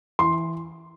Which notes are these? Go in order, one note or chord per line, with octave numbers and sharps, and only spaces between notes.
E3 C6